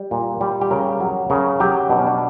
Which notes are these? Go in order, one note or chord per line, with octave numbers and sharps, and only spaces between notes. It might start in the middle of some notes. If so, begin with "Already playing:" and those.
Already playing: G3
A#2
G3
G4
C#3 A#4
F#3
C#3 A#4
F#3 G4
B2 D4
C#4
D4